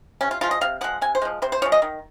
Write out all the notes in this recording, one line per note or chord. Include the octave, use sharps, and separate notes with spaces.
C3 C#4
F4
F3 G#3 F4
D#5
C3 F5
F3 G#3 F#5
C3 G#5
C5
F3 G#3
C3 C5
C5
F3 G#3 C#5
D#5
D#3